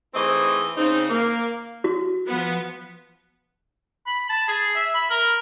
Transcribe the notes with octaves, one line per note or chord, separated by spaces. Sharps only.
E3 A3 C4 D#4 G#4 D#5
C#3 C4 D#4
A#3
F#4
F3 B3
B5
A5
G#4
E5
B5
A#4